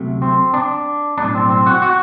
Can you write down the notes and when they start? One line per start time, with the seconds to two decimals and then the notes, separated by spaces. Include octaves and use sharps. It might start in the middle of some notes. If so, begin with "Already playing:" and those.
Already playing: D2 C3 F#3 A3
0.22 C4
0.54 D4
1.18 B1 A2 G3 D4
1.35 C4
1.50 C4
1.66 F#4
1.82 F#4